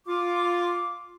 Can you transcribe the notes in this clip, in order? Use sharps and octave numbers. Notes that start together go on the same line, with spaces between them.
F4 D6